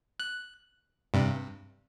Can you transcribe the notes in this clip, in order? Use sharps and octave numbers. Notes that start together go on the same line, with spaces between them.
F#6
G2 C3